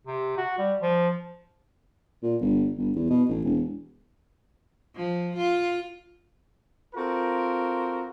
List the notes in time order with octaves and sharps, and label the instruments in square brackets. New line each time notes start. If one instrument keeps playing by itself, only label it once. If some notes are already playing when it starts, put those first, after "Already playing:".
[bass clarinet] C3
F#4
G3
F3
[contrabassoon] A#2
G1
G1
E2
B2
A1
E1
[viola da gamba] F3
F4
[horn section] C4 F4 F#4 A4 A#4